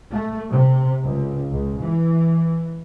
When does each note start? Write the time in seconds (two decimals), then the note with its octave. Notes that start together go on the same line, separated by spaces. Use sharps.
0.11 A3
0.50 C3
1.03 C#2
1.51 C#2
1.79 E3